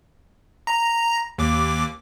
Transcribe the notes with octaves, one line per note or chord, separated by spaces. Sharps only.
A#5
D#2 D6